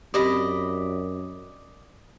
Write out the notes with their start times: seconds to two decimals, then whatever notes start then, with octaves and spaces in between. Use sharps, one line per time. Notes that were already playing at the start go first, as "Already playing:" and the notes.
0.14 F#2 C4 G4 D5 D#5 B5